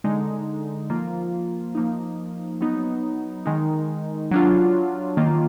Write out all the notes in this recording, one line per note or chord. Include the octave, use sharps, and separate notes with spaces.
D3 G#3 D#4
F3 A#3 F4
F3 A#3 D#4
F#3 B3 D#4
D#3 G#3 D#4
F#3 D4 F4
D#3 A#3 F4